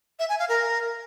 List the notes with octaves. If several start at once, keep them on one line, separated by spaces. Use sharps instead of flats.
E5
G#5
F5
A#4